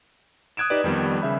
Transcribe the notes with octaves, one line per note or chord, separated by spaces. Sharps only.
D#6 F#6 G#6 D7 E7
D#4 G4 B4 D5
F2 D#3 G3 B3
C#3 E5 B5